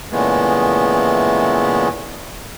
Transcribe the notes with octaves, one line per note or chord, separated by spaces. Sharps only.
A#2 C#3 E3 G#3 A3 B3